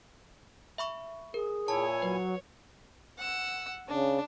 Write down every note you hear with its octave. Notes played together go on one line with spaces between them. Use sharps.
E5 B5 C#6
G#4 A#4
A#2 E4 C#5 G#5 A5
F#3 B4
F#5 E6
C#3 D4